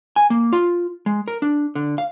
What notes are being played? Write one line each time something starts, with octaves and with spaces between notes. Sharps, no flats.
G#5
A#3
F4
G#3
A#4
D4
D3
F5